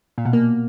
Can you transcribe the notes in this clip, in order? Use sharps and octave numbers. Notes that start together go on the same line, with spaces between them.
A#2
B2
A#3